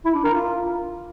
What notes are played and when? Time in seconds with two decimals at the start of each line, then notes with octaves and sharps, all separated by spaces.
0.05 E4
0.15 D4
0.24 A#4
0.34 F4